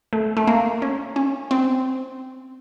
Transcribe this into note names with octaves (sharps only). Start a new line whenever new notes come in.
A3
A3
A#3
C#4
C#4
C4